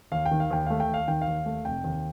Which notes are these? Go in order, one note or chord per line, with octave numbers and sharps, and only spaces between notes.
D#2 F5
G5
D#3
F5
D#2 G5
A3 F5
G5
D#2 F5
D#3 G5
F5
D#2
A3
F1 G5
D#2